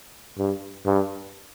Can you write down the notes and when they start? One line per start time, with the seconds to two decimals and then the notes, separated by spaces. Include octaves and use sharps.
0.38 G2
0.85 G2